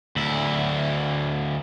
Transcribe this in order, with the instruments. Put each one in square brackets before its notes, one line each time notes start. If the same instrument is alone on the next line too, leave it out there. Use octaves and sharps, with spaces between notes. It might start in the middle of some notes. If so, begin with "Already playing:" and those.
[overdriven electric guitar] D2 E4